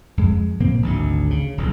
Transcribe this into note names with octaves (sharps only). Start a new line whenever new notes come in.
F2 G#3
A#2 F3 A#3 C4
G#1 D2 D3
C#3
D#1 A#1 E2